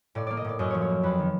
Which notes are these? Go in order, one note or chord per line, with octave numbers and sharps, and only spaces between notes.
A2 D5
A#3 D5
D#5
A2 D5
F#2 D#5
F3 C#5
C#5
A#3
F2 B4
D#3